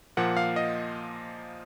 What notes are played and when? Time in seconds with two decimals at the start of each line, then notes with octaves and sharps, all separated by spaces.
0.17 A#2 F3 A#3 F#5
0.37 F5
0.56 D#5